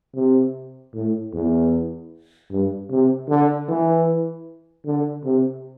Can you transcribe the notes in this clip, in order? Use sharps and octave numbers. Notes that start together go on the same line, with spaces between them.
C3
A2
E2
G2
C3
D3
E3
D3
C3